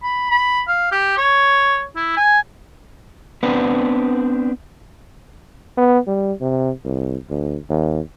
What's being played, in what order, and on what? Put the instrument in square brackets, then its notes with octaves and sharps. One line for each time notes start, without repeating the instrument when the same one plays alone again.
[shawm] B5
B5
F5
G4
C#5
E4
G#5
[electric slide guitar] B3 C4 D4 B4
[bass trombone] B3
G3
C3
C2
D2
D#2